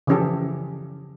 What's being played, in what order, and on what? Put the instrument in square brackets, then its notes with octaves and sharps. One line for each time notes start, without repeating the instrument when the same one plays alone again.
[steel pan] C#3 E3 F3 C#4 G4 A4